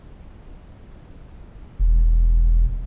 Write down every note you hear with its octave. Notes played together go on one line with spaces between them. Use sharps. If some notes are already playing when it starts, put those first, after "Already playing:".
E1